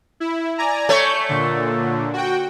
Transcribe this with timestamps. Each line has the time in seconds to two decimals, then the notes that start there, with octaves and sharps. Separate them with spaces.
0.20 E4
0.58 D5 G#5 A#5
0.89 A3 C#5 G6
1.29 A#2 D3
2.13 F#4 G5